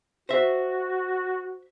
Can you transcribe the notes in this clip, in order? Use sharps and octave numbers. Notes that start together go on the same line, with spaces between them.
F#4 C5 E5